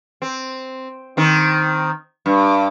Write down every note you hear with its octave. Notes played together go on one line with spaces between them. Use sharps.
C4
D#3 C4
G2